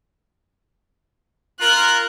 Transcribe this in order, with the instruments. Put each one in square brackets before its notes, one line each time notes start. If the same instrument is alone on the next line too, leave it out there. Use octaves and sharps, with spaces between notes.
[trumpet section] F4 A#4 [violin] F#6